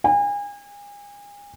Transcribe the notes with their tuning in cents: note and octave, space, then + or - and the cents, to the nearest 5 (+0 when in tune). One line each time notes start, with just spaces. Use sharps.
G#5 -35